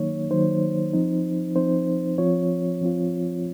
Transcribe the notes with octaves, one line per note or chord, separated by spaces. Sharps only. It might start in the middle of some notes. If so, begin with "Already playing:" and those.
Already playing: D#3 F#3 A#3 D#4 C#5
D#3 F#3 A#3 D#4 C5
F3 C4 D#4
F3 C4 D#4 C5
F3 C4 F4 C#5
F3 C4 F4